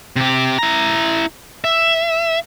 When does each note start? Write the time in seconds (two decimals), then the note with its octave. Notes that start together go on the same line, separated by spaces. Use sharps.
0.16 C3 G4
0.59 E4 A#5
1.64 E5